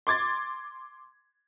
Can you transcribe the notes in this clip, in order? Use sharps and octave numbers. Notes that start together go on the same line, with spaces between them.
C6 D6 G#6 A6